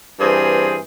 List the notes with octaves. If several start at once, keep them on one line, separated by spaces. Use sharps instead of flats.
G2 E3 C4 G#4